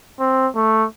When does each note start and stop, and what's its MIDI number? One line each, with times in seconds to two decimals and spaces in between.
0.20 0.48 60
0.55 0.85 57